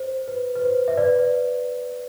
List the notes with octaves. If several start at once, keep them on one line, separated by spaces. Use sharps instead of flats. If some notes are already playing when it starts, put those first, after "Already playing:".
Already playing: C5
B4
B4
C5
E5
B4 D5